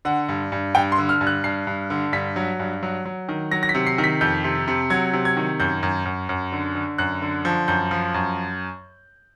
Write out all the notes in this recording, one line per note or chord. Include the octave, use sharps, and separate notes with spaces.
D3 F#5
G2
G2
G2 G5
C6
D3
F6
G2
F#6
G2 C7
G2
D3
G2 B6
F#3
G2
F#3
F#3
D#3
F#3 A#6
A#6
B6
C3
C7
D#3
B6
F2 G6
C3
C3
F#3 G#6
C3
G#6
D#3
F#2 G6
F#2
F#2
F#2
D3
D3
F#2 F#6
D3
F3
F#2 G6
F3
F#2